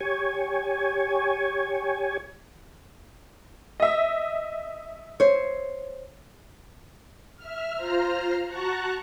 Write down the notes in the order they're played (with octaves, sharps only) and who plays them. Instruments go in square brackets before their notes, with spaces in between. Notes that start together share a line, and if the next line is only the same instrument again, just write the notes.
[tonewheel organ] G4 C#5 G#5
[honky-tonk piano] D#5 E5
[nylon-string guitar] C5 C#5
[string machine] E5 F6
F4 C5 A#5 F6
F#4 A5 A#5 C#6 F#6